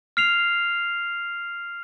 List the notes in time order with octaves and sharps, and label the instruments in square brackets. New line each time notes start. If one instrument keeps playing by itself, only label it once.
[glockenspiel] F6 C7 F7